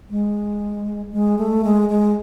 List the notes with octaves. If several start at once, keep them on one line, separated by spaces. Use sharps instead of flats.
G#3
G#3
A3
G#3
G#3